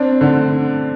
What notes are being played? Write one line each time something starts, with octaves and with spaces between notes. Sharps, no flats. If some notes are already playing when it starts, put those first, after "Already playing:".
Already playing: C4 D4
D3